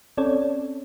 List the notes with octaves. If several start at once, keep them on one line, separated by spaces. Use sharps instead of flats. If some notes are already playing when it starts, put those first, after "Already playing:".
C4 C#4 A4 C#5 D5